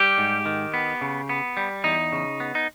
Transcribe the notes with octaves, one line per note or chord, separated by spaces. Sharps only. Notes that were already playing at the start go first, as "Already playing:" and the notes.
Already playing: G3 G4
G#2
D#3
B3
C#3
B3
G3
E2 D#4
C#3
B3
D#4